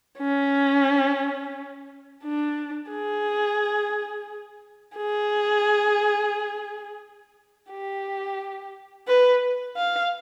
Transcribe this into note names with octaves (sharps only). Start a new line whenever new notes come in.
C#4
D4
G#4
G#4
G4
B4
F5